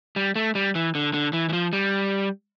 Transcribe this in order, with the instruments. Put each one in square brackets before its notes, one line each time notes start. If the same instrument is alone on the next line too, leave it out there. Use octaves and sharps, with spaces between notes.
[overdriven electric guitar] G3
A3
G3
E3
D3
D3
E3
E3
F3
G3